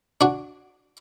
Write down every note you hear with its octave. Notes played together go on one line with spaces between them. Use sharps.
D4 F#4